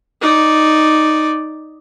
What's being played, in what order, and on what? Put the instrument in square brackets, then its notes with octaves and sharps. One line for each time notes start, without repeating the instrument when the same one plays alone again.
[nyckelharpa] D#4 D5